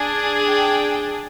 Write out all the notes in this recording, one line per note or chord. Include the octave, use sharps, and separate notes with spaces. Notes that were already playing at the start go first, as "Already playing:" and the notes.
Already playing: D4 G#4
G5